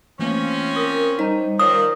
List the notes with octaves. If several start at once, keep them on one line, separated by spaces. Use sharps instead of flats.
E3 F3 A3 A#3 C4 C#4
A#4 D6 D#6
G3 D#4 C5 D#5 A#5
D#3 F3 A#4 C#5 D5 D#6